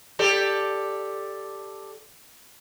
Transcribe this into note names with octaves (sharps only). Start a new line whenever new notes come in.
G4 A4 D5